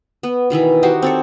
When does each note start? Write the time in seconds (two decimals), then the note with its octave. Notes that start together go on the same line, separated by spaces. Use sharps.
0.23 B3
0.50 B2 D#3 E3 E5
0.83 D#4 F#4 G4 C5
1.02 C4 A4 C#5